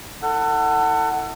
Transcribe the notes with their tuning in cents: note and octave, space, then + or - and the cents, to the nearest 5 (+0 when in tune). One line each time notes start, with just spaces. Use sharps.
E4 -20 A4 +30 F#5 +15